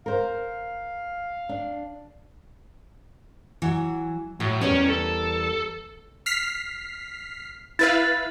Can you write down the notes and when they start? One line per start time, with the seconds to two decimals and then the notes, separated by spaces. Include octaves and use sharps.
0.06 A#4 C5 F5
1.49 D4
3.62 E3 F#3
4.40 A2 F#3
4.61 E2 G3 C#4 A#4
4.89 A4
6.26 F6 B6 C7
7.79 E4 B4 F5 A6